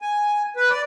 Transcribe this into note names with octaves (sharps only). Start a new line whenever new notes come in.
G#5
B4
D5